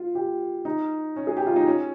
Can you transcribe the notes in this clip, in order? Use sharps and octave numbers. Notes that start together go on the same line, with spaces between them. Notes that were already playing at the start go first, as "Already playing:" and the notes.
Already playing: F4
G4
D#4
C#4
G#4
G4
F4
D#4
C#4